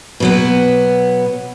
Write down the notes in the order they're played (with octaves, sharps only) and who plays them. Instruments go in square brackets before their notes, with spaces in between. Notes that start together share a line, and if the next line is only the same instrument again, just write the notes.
[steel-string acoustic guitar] B2 F#3 B3